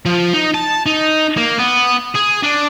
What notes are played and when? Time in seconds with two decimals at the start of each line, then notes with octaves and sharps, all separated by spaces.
0.06 F3
0.34 D#4
0.54 A5
0.86 D#4
1.37 A#3
1.58 B3
2.15 G#4
2.43 D4